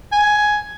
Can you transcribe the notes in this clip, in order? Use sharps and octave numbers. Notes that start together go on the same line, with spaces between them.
G#5